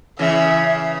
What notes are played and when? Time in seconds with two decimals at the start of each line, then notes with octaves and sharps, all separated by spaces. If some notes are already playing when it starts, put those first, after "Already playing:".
0.19 C#3 E3 E5
0.70 E5